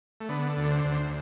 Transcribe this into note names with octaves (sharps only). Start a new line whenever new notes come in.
A3
D3 B3
A4
D2
C5
D2
C5